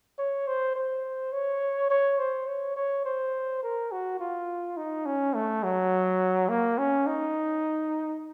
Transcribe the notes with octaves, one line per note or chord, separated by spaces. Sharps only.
C#5
C5
C5
C#5
C#5
C5
C#5
C#5
C5
A#4
F#4
F4
D#4
C#4
A3
F#3
A#3
C#4
D#4